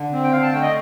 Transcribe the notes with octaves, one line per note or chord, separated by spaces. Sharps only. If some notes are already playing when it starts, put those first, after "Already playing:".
Already playing: D3
C4
G5
D3 F5
A5
A3 G5
D#5